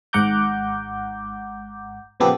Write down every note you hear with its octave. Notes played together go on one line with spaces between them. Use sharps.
G#1 G#2 F#5 A#5 D6 G6
A#2 C#3 F3 B3 G4 A4